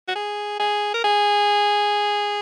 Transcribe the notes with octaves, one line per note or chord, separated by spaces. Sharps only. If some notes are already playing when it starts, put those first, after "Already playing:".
F#4
G#4
G#4
A#4
G#4